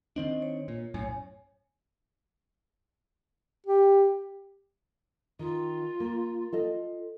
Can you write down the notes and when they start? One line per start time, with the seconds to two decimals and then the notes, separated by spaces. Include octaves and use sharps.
0.16 D#3 C4 D4 D#5
0.42 C#5
0.68 A#2
0.94 B1 F#2 A2 C#5 G#5
3.67 G4
5.39 D#3 F4
6.00 A#3
6.52 F4 A4 D#5